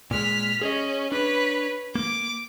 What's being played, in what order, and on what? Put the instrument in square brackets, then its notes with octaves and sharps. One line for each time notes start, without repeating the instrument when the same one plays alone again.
[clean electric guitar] A#2 G#3 [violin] F6 B6
[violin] C#4 [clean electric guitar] G#4 C#5 D#5
[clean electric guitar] D4 [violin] B4 C#5
[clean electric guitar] A#3 [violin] D6